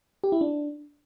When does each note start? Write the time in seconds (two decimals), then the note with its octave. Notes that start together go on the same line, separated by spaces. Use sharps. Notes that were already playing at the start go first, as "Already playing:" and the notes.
0.24 G4
0.32 E4
0.41 D4